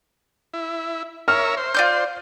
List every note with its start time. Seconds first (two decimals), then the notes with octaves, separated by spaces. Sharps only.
0.54 E4
1.28 A#4 C#5 E5 F6
1.57 C5
1.74 F4 D5 G6